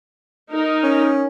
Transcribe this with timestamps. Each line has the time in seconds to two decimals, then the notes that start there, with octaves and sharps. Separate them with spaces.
0.51 D#4 A#4
0.84 C#4